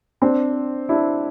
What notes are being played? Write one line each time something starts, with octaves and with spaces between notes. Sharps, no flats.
C4 D4
D4 E4